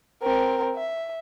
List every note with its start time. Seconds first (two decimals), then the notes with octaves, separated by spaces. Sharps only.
0.23 C4 A#4
0.75 E5